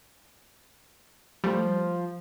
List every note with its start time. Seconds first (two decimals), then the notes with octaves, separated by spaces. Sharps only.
1.44 F3 G3 A3